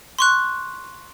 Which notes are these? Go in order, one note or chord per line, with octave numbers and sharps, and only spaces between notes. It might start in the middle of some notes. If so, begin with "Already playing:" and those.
C6 C#6 F#6